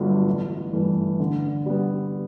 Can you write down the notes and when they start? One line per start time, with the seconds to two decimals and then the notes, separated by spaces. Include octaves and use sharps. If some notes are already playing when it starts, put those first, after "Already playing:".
Already playing: G1 G2 D3 F#3 A3
0.27 A1
0.73 G2 E3 A3
1.20 D3
1.66 G3 B3